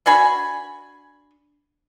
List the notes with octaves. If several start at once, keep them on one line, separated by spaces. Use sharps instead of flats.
D4 F#4 G#5 B5